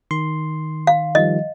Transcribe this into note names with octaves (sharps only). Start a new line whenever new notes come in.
D#3 C6
F5
D#3 F3 G3 D#5